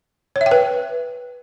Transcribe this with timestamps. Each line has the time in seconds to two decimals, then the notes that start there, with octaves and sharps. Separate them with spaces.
0.36 C#5
0.41 E5
0.46 G5
0.51 B4